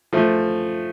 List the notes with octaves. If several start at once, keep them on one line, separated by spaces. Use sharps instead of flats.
F3 A3